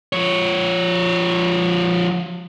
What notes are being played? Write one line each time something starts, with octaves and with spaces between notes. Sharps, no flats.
F3 C#5